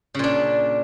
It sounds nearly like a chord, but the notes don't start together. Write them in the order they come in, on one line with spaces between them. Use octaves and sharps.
C#3 A#2 D4